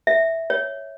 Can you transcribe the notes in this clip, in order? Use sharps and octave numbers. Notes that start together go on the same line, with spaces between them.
E5
C#5